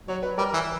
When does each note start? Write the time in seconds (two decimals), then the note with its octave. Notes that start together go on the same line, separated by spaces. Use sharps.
0.08 F#3 C#5
0.23 B4
0.38 G3 A#4
0.54 E3